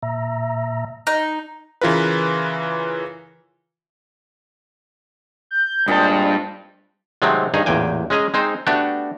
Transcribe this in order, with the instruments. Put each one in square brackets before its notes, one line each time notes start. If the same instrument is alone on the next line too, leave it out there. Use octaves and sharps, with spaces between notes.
[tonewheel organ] A#2 E5 A#5
[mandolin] D#4
[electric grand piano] C#3 E3 F4 A#4 B4
[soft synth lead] G6
[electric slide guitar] G2 A5 [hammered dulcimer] A#2 G#3 C4
[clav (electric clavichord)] C3 D#3 F#3 G#3 A3 C4
G2 D#3 D#4 G#4 A#5
A1 E2 A#2 G5 G#5
G#3 C#4 G#4 D#5 A#5
G#3 C4 D#4 C5
A3 B3 D4 F#4 G4